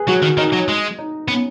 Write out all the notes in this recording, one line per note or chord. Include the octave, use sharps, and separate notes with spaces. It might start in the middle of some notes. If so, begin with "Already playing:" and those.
Already playing: G#4 B4
F#3 F#4
D#3
D#3 D#4
F#3
G#3
D#4
B3 C#4